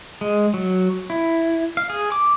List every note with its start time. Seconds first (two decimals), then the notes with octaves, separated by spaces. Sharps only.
0.21 G#3
0.54 F#3
1.10 E4
1.77 F5
1.90 G#4
2.12 D6